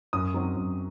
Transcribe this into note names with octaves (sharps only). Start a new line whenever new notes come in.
F#2 D#6
F#3 C4 D#4
F#2